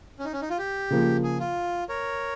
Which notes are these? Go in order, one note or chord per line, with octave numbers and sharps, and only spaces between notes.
C#4
D#4
C#4
D#4
F4
G4
C#3 F3 A#3
G#4
F4
A#4 C#5